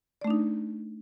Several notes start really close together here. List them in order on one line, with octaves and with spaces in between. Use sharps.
D5 A3 D4 D#4